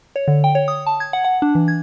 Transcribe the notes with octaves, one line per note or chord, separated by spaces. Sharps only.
C#5
D3
G5
C#5
D#6
A5
G#6
F#5
F#5
D4
E3
G#6